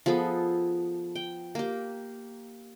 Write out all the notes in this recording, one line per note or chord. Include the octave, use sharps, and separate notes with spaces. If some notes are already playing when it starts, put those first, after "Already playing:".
F3 B3 G#4 A4
G5
A#3 G4